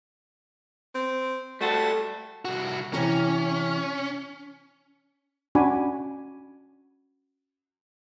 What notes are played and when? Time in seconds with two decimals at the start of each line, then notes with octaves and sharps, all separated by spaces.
0.95 C4
1.61 G3 A3 F#4 A4
2.45 C2 F#4
2.94 C3 E3 C#4 A#5
5.55 C#4 D4 F#4 G#5 B5 D6